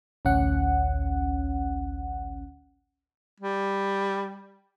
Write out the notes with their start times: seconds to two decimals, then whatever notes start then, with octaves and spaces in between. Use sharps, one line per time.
0.25 A1 D2 C#4 F#5
3.40 G3